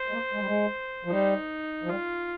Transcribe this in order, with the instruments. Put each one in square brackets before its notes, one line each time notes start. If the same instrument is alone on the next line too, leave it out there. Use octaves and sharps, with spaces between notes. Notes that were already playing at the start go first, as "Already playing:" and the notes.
Already playing: [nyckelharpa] C5
[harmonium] G#3
A#3
G#3
G3
G#3
F3
[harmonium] G3 [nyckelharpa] D#4
[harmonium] F3
[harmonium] G3 [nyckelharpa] F4